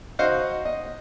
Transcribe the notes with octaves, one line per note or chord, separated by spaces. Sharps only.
D#4 F#4 C5 D#5 F5 F#5
D#5